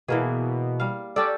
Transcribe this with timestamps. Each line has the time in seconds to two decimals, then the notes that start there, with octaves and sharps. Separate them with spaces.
0.08 B2 E3 A#3 G#4
0.80 G3 F5
1.16 C#4 G4 A4 D5